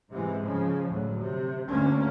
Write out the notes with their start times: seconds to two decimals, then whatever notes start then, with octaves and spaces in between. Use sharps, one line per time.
0.12 G#2 C3 E3 G#3
0.42 C#3 F3
0.88 D2 A2 F#3
1.20 C3
1.67 D2 D3 A#3 C#4